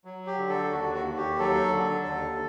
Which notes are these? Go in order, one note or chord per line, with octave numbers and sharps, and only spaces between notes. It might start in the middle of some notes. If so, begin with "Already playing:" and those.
F#3
G4
D3
A4
D#2 F#4
F#4
D#2
G4
F#3 A4
D3
D#2